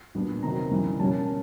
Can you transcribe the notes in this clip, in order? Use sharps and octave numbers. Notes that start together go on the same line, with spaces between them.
A#2 G3 B3 D4
C3 D#3 F#3 A#5
C#3 E3 G3
B2 G3 A#3 C#4 A5